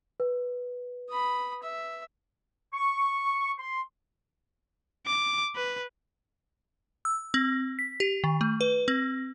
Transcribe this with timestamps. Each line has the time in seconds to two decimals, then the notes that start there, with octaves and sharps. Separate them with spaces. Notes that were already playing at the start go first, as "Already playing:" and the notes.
0.20 B4
1.10 B5 D#6
1.63 E5
2.73 C#6
3.59 C6
5.06 D6
5.55 B4
7.05 E6
7.34 C4
7.79 B6
8.00 G4
8.24 D#3
8.41 A3
8.61 B4
8.88 C4